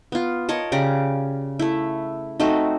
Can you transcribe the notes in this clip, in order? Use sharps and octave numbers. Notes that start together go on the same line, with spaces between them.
B3 F4
A#4 C#5 D#5 A5
C#3 G4 D5 A#5
A3 E4
A3 C4 D#4 F#4